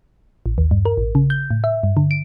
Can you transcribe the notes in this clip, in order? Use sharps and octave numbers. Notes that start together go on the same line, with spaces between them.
A1
D#2
G2
A#4
A1
C#3
G6
A2
E5
G2
D3
D7